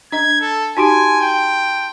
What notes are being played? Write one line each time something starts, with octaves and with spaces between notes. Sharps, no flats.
D4 D#5 G#6
A4
D#4 F#4 G4 G#5 A5 C6 D7
G5